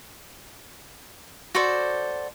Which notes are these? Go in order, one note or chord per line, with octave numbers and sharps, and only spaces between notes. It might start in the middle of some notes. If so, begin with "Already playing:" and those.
F#4 A4 C5 D5